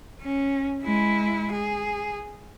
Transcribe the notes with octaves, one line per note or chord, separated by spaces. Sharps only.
C#4
G#3 E4
G#4